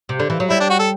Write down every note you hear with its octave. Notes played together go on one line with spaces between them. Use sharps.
C3
D3
E3
F#3
G3 E4
D4
F#4
A4